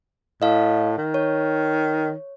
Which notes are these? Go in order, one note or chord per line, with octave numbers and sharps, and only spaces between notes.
A2 D#5 F5
D#3
C#5